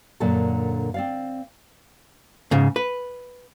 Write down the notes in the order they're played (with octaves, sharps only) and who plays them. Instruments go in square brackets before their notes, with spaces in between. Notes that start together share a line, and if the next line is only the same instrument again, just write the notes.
[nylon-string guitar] F#2 A#2 D3 A4 A5
C4 D5 F5
[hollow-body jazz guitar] G#2 C#3
B4